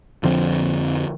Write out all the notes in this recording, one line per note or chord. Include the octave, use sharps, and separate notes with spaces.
F2 D3 F3 C4